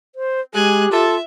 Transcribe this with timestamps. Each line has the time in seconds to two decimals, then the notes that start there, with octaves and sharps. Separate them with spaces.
0.15 C5
0.54 G#3 G4 G#4 G#5 F#6
0.91 F4 A4 E5